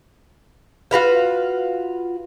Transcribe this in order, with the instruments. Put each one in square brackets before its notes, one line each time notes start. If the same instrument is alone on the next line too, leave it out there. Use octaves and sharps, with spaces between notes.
[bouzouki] F4 F#4 B4 F5